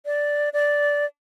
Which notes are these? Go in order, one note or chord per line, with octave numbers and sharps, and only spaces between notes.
D5
D5